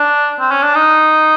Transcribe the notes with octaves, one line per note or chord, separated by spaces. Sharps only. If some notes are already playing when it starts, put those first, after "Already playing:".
Already playing: D4
C4
C#4
D4
D#4